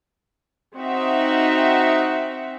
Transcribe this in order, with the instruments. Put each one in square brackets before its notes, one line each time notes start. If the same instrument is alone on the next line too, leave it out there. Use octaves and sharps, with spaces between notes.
[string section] C4 D#4 F#4 E5